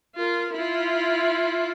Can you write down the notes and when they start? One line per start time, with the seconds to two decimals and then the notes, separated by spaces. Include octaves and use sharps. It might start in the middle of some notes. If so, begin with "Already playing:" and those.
0.15 F4 A#4
0.52 E4 F4